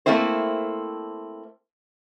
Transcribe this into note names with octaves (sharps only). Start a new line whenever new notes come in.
A3 A#3 C4 E4 C5